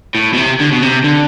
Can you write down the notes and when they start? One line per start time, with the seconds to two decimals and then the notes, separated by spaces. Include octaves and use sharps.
0.15 A2
0.33 B2
0.37 C3
0.60 D3
0.72 B2
0.82 C3
1.04 D3